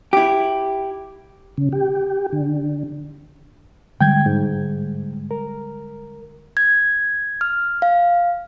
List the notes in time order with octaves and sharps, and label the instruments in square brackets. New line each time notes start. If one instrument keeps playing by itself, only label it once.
[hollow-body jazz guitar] E4 G4
[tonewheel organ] C#3
G4
D3
[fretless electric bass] D3 G3 G#3 [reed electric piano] G5 G6 G#6
[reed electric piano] G#2
A#4
[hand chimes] G#6
F6
F5